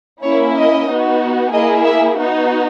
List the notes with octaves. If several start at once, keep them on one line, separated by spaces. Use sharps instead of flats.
A#3 C#4 E4 C#5
D#5
B3 D#4 F#4
A#3 E4 G#4 D#5
E5
B3 D#4 F#4